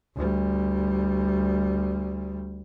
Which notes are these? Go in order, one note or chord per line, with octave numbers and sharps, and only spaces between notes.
D2 G3